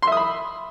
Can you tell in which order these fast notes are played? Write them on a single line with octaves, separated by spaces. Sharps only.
C6 E5 D#6 B5